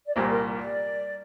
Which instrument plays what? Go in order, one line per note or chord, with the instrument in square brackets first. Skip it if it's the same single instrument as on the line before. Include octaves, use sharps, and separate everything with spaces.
[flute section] D5
[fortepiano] C2 A#2 G3 A#3 [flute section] C5
[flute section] A#4
D5